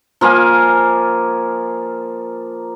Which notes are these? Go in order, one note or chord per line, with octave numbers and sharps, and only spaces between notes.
F3 A#3 F5 G#5